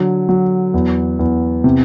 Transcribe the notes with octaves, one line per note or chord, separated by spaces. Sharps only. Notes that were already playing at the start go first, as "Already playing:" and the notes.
Already playing: D3 F#3
F#3
E2
E2
C3